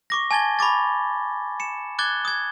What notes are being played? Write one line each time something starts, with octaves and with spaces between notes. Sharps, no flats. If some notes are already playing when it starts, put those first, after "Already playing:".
C#6 D6 A#6
G#5 A5 G#6 A6 G7
B5 C#6 D6 A6
C#7 E7
D6 F#6 G#6 A6 G7
D#6 G#6